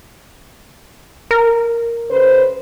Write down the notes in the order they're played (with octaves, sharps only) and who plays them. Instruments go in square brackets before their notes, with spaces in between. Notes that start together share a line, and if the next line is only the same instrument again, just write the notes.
[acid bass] A#4
[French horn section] C#3 B4 C5